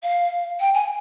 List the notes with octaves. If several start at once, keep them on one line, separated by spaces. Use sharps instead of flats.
F5
G5
G#5